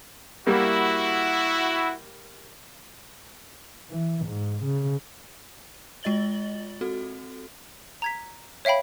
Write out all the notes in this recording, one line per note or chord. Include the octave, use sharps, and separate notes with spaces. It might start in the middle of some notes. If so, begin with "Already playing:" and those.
G3 A#3 E4 F#4
E3
G#2
C#3
G#3 F4 D#5 A6 F#7 G7
C4 F#4 A4
A#5 G#6 B6
C#5 E5 F5 G5 B5